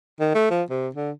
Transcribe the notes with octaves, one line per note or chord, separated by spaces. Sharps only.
D#3
A3
F3
C3
D3